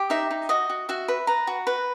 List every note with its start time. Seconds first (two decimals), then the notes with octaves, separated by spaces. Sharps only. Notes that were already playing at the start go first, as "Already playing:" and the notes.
Already playing: G4
0.10 D#4 E5
0.31 D#4
0.49 F#4 D#5
0.70 F#4
0.89 F#4 E5
1.08 B4
1.27 B4 A#5
1.47 F#4
1.67 B4